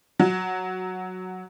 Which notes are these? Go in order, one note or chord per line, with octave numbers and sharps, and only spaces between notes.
F#3